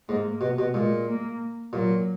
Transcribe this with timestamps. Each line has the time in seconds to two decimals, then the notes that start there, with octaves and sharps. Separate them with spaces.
0.09 G#2 A#3
0.41 B2
0.59 B2
0.74 A#2 G#3
1.07 A#3
1.73 A#2 F#3